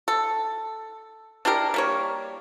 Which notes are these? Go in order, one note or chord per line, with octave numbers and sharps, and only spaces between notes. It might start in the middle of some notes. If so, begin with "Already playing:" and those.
A4
D4 E4 G4 A#4
G3 A#3 C#5